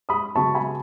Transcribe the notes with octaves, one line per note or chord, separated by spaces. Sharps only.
B5 D#6
C#3 F#3 B3 A5 C#6
G#5 B5